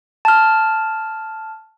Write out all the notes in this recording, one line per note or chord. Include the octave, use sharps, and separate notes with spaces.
A5 F6